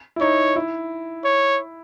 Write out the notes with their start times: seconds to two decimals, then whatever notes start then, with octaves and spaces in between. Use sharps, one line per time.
0.16 E4
0.21 D#4 C#5
0.56 E4
1.24 C#5